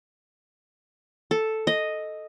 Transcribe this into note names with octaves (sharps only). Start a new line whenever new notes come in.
A4
D#5